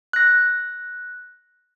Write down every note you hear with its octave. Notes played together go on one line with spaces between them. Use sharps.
F#6 A#6